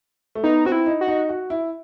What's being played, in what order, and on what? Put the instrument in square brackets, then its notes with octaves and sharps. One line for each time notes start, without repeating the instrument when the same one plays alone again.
[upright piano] A3
[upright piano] B3 [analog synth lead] D#4
[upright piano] C4 [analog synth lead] F#4
[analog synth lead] E4
[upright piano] D#4
[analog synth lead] F#4
[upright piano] D#4
F#4
E4